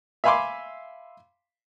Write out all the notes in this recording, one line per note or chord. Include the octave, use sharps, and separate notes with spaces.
E5 F5 G#5 B5 C6 D6